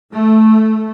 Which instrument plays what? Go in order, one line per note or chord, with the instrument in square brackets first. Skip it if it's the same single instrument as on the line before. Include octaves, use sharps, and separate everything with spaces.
[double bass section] A3